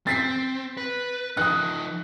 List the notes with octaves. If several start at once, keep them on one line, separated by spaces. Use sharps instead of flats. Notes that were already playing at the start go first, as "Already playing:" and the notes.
C4 A6 B6 C7
B4
F3 D#4 D#6 F#6